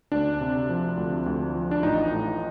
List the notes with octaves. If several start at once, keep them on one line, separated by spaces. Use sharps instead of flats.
D2 D4
C3
F3
D2
D2
F3
D4
A1 D#4
A2